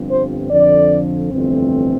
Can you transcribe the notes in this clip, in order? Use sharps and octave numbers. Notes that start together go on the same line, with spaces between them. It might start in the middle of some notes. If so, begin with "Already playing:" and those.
Already playing: G1 G2 F3 C4
C5
F2 D3 F3 D5
G1 F2 E3 A3 C4